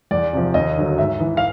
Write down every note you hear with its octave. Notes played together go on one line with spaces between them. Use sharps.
E2 D5
C3 F3
D#2 D#5
D3 F#3
G#2 E5
E3
F5